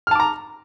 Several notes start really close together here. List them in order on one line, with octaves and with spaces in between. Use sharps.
F6 A5 D6 A#5